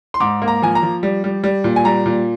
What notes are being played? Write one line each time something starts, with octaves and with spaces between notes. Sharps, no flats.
C6
G#2 D6
A#3
A#5
F3 G#5
A#5
F3
G3
G3
G3
A#2
G#5
G3 A#5
A#2